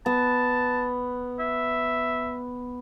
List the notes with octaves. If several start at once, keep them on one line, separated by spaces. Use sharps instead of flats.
B3 A5
E5